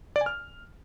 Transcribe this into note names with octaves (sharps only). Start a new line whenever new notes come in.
D5
G#5
F6